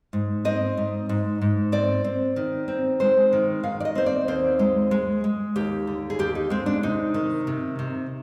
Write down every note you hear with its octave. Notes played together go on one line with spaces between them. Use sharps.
G#2
C4 D#5
G#2
G#2
G#2
C4 D5
C4
D#3
C4
G#3 C5
D#3
D#3 F5
D5
D#5
C4 C5
D5
D#2 C5
G#3
G#3
G#3
D#2 G4
D3
G#4
D#2 G4
D#4
G#3 C4
D4
C3 D#4
D#3
C3
C3